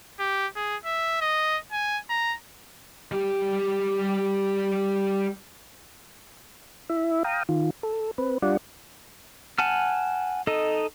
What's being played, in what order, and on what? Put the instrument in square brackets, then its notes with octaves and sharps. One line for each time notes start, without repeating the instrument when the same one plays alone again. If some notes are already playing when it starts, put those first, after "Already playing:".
[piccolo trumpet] G4
G#4
E5
D#5
G#5
A#5
[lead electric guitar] G3 G4
[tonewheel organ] E4 E5
F5 G5 A#5 D#6
D#3 F4
A4
C4 B4
G3 D4 F4 D5 F#5
[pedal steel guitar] F#5 G#5 A5 F6
D#4 A4 D#5